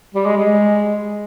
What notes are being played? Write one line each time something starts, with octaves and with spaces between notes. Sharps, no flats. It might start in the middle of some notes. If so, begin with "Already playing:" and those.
G3
G#3
G#3